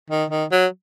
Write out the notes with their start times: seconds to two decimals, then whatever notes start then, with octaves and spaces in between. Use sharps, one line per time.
0.10 D#3
0.30 D#3
0.52 F#3